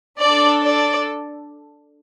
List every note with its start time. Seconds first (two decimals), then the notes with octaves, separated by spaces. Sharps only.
0.20 D4 A4 D5
0.63 D5